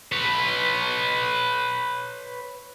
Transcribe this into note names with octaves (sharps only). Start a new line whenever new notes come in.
B4 C#5